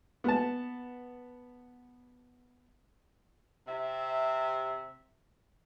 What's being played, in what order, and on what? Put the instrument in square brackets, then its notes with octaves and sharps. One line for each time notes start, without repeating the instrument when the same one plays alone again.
[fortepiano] B3 A5
[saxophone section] C3 E5